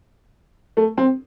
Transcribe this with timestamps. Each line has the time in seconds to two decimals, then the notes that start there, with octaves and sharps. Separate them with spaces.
0.77 A3
0.98 C4